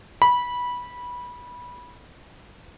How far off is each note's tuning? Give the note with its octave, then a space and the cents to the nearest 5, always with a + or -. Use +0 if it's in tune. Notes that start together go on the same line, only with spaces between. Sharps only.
B5 -15